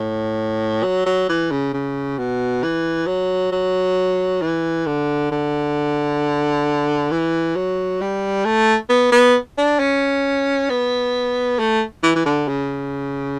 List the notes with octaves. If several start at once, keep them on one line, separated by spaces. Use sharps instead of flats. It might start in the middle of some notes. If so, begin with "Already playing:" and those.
Already playing: A2
F#3
F#3
E3
C#3
C#3
B2
E3
F#3
F#3
E3
D3
D3
E3
F#3
G3
A3
B3
B3
D4
C#4
B3
A3
E3
E3
D3
C#3